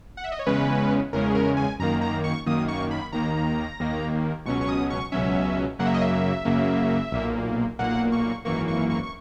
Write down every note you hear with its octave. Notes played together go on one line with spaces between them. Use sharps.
F#5
E5
D#5
C#5
E2 C#3 G#3 C#4 B4
E2 C#3 G#3 C#4 A#4
G#4
A#4
G#5
F#2 D#3 A#3 A#5
A#5
C#6
F#2 D#3 A#3 D#6
C#6
B5
D#2 D#3 A#3 A#5
D#2 D#3 A#3
C#2 B2 F#3 C#4 C#6
C#6
D#6
C#6
C#2 B2 F#3 C#4 E5
F#2 C#3 F#3 A#3 F#5
E5
D#5
E5
F#2 C#3 F#3 A#3
B1 A#2 A#3
B1 A#2 A#3 F#5
C#6
G#1 F#2 E3 A#3 C#6
C#6
C#6
C#6